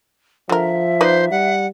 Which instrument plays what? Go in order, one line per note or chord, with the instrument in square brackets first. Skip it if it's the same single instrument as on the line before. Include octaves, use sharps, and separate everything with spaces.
[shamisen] D3 A#4 [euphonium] F3 [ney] E5
[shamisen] D#4 B4 D5 [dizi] C5
[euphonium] G3 [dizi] F#5